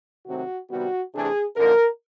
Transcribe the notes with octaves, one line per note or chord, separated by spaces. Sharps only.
C3 D#3 F#3 A3 C4 F#4
C3 D#3 G3 B3 F#4
C3 E3 A3 D4 G#4
F#2 D3 F3 A#3 D#4 A#4